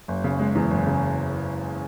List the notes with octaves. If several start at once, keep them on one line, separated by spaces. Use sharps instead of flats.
F#1
C#3
G#3
E2
F#1
C#3